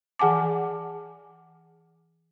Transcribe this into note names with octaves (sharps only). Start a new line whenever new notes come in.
E3 G#4 F#5 G#5 A5 D6